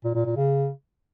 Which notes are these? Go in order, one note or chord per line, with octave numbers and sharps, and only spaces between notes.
A#2
A#2
A#2
C#3